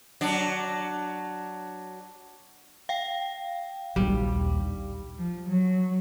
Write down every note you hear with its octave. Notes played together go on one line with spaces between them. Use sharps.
F#3 D4
F5 G5
A#1 D#2 G3
F3
F#3